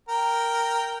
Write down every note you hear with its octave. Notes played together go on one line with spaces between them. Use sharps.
A#4 G5